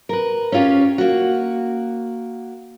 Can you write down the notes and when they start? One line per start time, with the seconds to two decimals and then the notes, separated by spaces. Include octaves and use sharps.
0.09 A#4 B4
0.52 C#4 E4 F4 G4 C#5
0.98 A#3 F#4